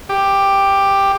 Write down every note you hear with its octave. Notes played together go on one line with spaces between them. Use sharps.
G4